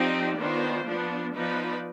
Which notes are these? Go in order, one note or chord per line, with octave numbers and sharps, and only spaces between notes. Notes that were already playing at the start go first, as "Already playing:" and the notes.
Already playing: F3 C4 D#4 G4 D5
D#3 B3 D4 F4 C5
F3 B3 D4
F3 B3 D#4 B4 D5